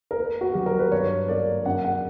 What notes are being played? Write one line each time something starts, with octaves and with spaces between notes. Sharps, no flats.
A#4
A#3 B4
F#4
F#3 G4
A#4
B4
G2 C#5
A#3 D5
F#2 F#5
F#5